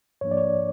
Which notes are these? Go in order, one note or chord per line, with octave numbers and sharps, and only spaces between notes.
G#2 F3 A#3 D4 C#5
D5
C#5